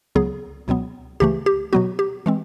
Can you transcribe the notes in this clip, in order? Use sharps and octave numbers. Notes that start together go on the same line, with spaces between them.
C#2 C#3 F#3 B3 G#4
C#2 B2 F#3 B3
C#2 C#3 E3 A3 G4
G4
B2 F#3 B3 F#4
G4
E3 G#3 C4